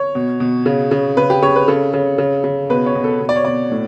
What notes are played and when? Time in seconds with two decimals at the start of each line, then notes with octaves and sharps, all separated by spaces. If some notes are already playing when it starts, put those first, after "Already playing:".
Already playing: C#5
0.15 B2
0.40 B2
0.66 C#3
0.91 C#3
1.17 C#3 B4
1.30 G4
1.42 C#3 C#5
1.56 B4
1.68 C#3 A4
1.94 C#3
2.18 C#3
2.44 C#3
2.70 B2 B4
2.86 C#5
2.95 B2
3.04 A4
3.21 B2
3.29 D5
3.36 C#5
3.45 B2 D5
3.72 A2